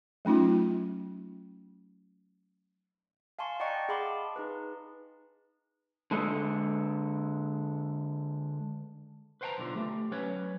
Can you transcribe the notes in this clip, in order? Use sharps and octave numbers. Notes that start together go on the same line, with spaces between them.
F#3 A3 C#4 D#4 F4
F5 G#5 A5 C6 C#6
D5 D#5 F#5 G5 A#5 C#6
G#4 F5 A5 B5 C6 D6
D#4 G#4 B4
D3 G#3 A4
B4 C5 F5 G5 A5 A#5
B1 D3 F4
A3 G4
F#3 C#4 B4 C#5